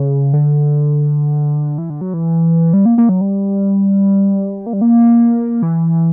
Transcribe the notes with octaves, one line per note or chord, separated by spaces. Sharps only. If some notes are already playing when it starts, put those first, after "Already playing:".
Already playing: C#3
D3
E3
D3
F#3
E3
G3
A#3
A#3
F#3
G3
A#3
G3
A#3
E3